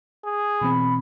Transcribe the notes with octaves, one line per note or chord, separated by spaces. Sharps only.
G#4
B2 E3 C4 B5